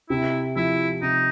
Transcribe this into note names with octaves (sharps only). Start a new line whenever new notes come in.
C3 E4
F3 E4
C3 D#4